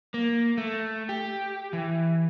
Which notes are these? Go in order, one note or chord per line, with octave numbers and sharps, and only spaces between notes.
A#3
A3
G4
E3